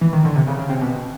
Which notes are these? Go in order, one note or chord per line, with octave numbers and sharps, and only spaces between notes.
E3
D#3
D3
C3
C#3
C#3
C3
B2